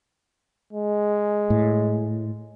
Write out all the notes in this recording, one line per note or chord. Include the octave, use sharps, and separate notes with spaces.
G#3
A2